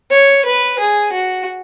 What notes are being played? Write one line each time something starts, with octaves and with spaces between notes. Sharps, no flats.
C#5
B4
G#4
F#4